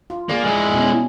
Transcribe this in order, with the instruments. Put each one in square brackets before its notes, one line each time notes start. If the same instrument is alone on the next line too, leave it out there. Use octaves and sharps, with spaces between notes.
[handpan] F4
[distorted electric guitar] A#3 [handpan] G#4 D5
[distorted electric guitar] G#3 E4
[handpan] B2 C#4